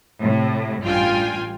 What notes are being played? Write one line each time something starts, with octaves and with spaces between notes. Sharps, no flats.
A2 C3
A1 G2 F4 G5 G#5